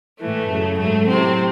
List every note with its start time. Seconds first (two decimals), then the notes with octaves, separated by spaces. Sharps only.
0.19 A2 E3 A3
0.49 F#2 C#3 F#3
0.78 G#2 F#3 A3
1.07 A2 C3 F#3 C4